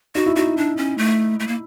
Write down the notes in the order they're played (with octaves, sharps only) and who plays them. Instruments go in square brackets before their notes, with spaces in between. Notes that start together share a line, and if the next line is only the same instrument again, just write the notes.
[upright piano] D#4 [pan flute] F#4
[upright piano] E4
[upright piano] D#4 [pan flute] F#4
[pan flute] D4
C#4
A3
A3
A#3